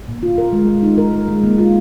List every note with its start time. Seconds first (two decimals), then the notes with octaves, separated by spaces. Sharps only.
0.08 A#2
0.23 F4
0.38 A#4
0.53 G#3
0.68 G#3
0.83 D#4
0.98 A#4
1.13 G#3
1.28 G#3
1.44 A#3
1.58 F4